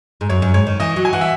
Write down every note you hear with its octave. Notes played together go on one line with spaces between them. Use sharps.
G#2
F#2 C#5
F#2
G#2 C#5
D#3
E3 D#5
F#3
G#5
E3 F#5
E5